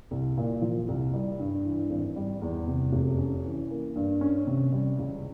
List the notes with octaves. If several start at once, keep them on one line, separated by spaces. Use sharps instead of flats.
C2
A#2
F3
C2
G3
G2
E3
G#1
G3
E2
C3
F1
C#4
E3
A#3
G2
C#4
C3
G3
C#2